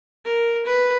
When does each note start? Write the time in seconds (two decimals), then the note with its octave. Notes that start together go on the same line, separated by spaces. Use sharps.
0.25 A#4
0.66 B4